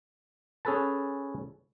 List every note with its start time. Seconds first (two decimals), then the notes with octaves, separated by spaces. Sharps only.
0.65 C#4 G#4 A4 B4 A5